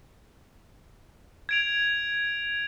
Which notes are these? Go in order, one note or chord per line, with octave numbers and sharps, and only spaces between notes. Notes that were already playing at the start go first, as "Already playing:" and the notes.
G#6 D7 F7